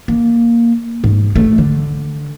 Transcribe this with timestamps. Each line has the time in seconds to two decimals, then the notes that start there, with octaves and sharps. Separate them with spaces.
0.08 A#3
1.04 G#2
1.36 A3
1.58 D3